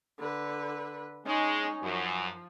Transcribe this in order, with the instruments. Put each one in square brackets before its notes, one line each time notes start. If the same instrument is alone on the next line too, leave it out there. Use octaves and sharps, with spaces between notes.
[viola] D3 B4
[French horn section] G#3 [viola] C#4 D#4
[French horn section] F#2 [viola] F3